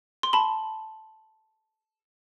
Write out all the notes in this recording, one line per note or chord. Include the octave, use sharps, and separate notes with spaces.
C6
A5 B5